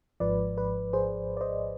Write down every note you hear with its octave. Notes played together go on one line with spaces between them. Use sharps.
G#1 G#2 F3 B4 D5
B4
G#4 C5
D5
C5 D#5